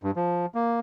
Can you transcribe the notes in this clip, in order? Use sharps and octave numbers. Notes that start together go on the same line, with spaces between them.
G2
F3
A#3